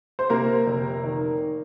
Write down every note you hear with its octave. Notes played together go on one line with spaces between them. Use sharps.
C5
C3 A#3 A#4
F1
D#3